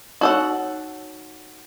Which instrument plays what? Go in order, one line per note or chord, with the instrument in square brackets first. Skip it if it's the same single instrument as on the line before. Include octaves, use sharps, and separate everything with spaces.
[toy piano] D#4 C#5 E6 [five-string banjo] F#4 A4 F#5